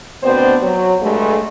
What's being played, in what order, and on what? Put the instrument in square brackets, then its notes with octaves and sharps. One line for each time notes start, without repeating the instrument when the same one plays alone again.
[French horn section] D2 B2 B3 C4 D4 C5
F#3
G2 G#3 A3